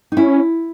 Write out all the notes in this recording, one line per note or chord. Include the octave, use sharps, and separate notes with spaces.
D#4
C#4 E4